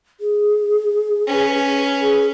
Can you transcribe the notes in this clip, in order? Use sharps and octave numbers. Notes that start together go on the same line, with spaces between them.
G#4
C#4 B4
G#4